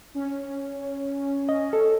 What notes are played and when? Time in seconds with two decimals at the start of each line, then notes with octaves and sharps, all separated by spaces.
0.15 C#4
1.49 D#5
1.73 A4